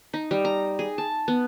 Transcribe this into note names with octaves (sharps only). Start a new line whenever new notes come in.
D#4
G3
A#5
G#4
A5
B3